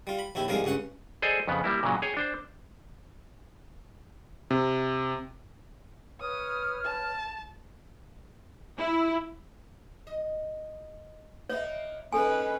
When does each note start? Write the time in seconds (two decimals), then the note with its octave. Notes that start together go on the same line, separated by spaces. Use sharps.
0.07 G3 F4
0.19 B5
0.35 A#1 D#2 E4 G4
0.48 C2 G#2 F3 G3 G#3 A#4
0.64 C#2 G2 C#4 F#5
1.22 G#4 A4 C5 D5 D#5 G#5
1.48 F2 C#3 B3
1.64 G3 A#3 E4
1.83 A#2 C#3 F#3
2.02 G#4 C#5 G5
2.17 D4 C5
4.51 C3
6.20 B4 C#5 D#6 F6
6.85 A5
8.78 E4
10.07 D#5
11.49 A#3 B3 C#5 D#5 E5
12.13 G#3 C4 C#4 D#4 A4 B4 G#5